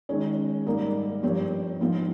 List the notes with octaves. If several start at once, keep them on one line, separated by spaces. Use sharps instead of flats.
D#3 G#3 C#4
G#2 G3 A#3 D#4 A#4
G2 F3 C4 G4 C#5
G#2 F3 C4 F4